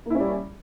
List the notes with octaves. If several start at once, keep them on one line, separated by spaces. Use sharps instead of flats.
G3 A#3 C#4 E4